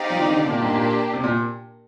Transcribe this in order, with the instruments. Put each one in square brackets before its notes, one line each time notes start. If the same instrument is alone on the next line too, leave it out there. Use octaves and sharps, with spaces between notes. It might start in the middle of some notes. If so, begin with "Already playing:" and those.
Already playing: [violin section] C4 D#4 G4 D5 F5
[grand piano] F3
D#3
D3
C3
[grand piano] A#2 [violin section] A#3 D4 G4
[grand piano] G#2
A#2
C3
A#2